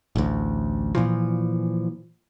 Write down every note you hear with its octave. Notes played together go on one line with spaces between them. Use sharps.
A1 D2
A#2 E3 F3